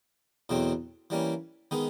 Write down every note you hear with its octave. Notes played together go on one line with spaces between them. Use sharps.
E2 B2 F#3 A3 C4
E3 G3 A#3 C#4
D#3 G#3 B3 D#4